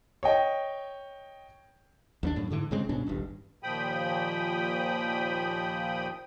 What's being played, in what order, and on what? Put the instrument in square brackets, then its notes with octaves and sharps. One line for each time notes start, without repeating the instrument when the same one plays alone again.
[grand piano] C#5 D#5 G5
[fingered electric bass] D#2 B3 D4
F#2 A2
G#2 D3 E3
G1 C#3 G#3 C4
G2 B2 C#4 D4
D#1 G#1 G2
[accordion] D#2 A#2 F3 G5 B5 D#6